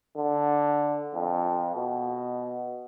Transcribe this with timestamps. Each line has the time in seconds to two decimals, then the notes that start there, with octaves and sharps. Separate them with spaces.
0.16 D3
1.14 F2
1.75 B2